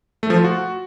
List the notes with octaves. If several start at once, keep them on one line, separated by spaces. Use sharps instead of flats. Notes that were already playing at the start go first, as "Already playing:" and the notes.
A3
F3
F4
F#4